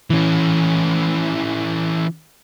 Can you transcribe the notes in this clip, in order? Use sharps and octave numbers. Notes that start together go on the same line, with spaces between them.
E3 C#4